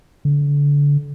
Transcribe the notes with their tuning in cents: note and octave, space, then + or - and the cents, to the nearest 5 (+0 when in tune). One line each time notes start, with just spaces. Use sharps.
D3 -30